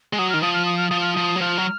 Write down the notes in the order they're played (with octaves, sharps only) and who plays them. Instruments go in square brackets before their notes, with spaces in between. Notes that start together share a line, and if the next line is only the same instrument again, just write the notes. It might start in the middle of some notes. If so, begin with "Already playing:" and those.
[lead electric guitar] G#3
[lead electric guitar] F#3 [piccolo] D#6
[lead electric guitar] D#3 [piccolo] F6
[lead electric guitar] F3 [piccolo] D#6
[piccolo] F6
D#6
F6
[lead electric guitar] F3 [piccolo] D#6
[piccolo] F6
[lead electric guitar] F3 [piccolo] D#6
[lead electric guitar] F#3
[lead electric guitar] F3 [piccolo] F6
[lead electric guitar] F#3